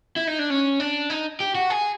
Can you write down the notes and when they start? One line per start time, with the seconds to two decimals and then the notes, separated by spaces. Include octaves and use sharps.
0.16 E4
0.27 D#4
0.39 D4
0.50 C#4
0.80 D4
1.10 D#4
1.40 G4
1.55 F#4
1.70 G#4